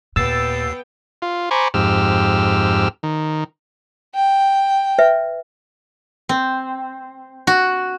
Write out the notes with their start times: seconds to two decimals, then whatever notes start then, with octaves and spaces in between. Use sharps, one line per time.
0.16 D#2 A#2 B3 G5 E6 A6 C7
1.22 F4
1.51 C5 G#5 A#5 B5 C#6 D6
1.74 F2 G#2 G4 E6 F6
3.03 D#3
4.15 G5
4.99 B4 E5
6.29 C4
7.47 F#4